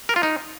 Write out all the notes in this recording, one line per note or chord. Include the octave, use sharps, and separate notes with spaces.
A#4
F4
D#4